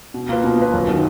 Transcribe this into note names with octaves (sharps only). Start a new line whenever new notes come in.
B2
A#3 F4 B4
B2
A#3 F4 B4
F#2
D#3 F#3